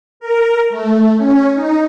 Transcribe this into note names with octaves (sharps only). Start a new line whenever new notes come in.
A#4
A3
C#4
D#4